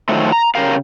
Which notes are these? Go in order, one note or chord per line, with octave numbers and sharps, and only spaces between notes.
D#3 F3 F#3 A3
A#5
C#3 F3 G4 A#4 F5